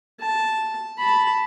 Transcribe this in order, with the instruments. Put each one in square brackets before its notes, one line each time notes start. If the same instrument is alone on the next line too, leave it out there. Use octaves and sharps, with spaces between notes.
[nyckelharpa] A5
A5 B5